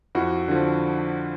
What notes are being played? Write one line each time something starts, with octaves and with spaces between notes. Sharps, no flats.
F2 E4 F#4
D3 F3